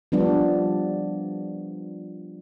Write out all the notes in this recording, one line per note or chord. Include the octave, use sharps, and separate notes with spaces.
F3 G3 B3 D4